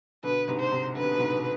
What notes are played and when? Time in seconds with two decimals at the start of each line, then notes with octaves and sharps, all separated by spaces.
0.23 B2 D3 B4
0.48 G#2 C3
0.60 C5
0.71 G#2 C3
0.96 D3 B4
1.03 C3
1.11 B2
1.19 G#2 C3
1.32 B2